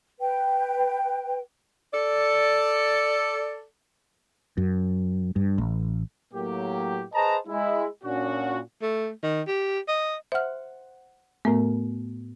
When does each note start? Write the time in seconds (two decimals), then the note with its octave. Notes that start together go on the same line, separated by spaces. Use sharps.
0.20 B4 G5
1.93 A4 D5
4.57 F#2
5.36 G2
5.58 A1
6.34 A2 F#3 A#3 G4
7.14 G#4 B4 C5 D#5 A5 A#5
7.48 G#3 E4
8.04 A#2 C#4 D4 F#4
8.82 A3
9.23 D#3
9.48 G4
9.88 D#5
10.32 C5 E5 F#5 F6
11.45 A2 A3 B3 A#4